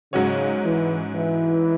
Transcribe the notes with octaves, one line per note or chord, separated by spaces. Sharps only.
G#2 C#3 F#3 C#4 F#4 C#5
E3
E3